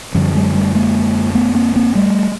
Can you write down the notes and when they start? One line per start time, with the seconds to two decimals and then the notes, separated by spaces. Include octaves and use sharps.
0.14 F#2 D3 F3 G3
0.35 F#3 G#3
0.54 G3 A3
0.75 G#3 A#3
1.35 A3 B3
1.55 A#3 C4
1.76 A#3 C4
1.95 G3 A3